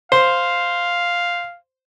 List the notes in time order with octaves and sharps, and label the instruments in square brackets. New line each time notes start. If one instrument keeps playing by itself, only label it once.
[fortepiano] C5 [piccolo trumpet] F5